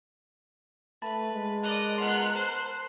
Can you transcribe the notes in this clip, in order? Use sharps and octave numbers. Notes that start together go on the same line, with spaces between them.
A3 B4 A5 B5 A6
G#3
A#4 D5 D#5 F#6 F7
B3 F4 C6 C7 F7
C5